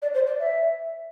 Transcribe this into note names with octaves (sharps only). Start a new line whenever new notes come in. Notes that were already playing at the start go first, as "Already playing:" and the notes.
D5
C5
D5
E5